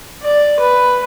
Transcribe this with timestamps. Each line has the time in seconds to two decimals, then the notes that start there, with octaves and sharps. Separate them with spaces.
0.23 D5
0.60 B4